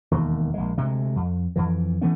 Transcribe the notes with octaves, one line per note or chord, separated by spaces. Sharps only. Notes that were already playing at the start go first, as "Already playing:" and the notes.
E1 D#2
A#1 G#3
D2 C3 G#3 A3
F2
F2 E3
E3 A3 B3 C#4